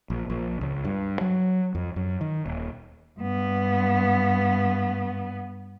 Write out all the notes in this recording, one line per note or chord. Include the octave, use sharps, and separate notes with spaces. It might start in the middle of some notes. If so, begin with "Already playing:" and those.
A#1
A#1
C#2
G2
F#3
F2
F#2
D#3
D#1
G2 B3